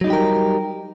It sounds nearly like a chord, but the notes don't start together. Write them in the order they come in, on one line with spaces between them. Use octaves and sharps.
F#3 D#4 G3 G4 A#4